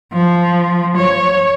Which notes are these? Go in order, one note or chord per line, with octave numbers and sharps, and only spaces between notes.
F3
C#5